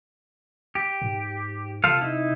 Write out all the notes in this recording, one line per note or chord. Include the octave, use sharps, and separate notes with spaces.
G4
G#2
C3 F4 A4 F5
D#4 E4